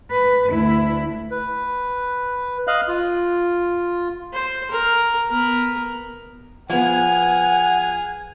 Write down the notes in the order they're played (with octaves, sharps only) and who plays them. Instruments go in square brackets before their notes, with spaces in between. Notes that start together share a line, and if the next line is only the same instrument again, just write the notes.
[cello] B4
D2 E4
[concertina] B4
[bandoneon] D#5 F5 F#6
F4
[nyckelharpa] C5
A#4
B3 A#4
[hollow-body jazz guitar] F3 B3 [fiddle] G#4 F6 [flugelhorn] F#5 [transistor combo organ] G#5